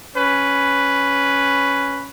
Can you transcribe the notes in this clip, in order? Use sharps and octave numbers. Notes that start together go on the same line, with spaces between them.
C#4 B4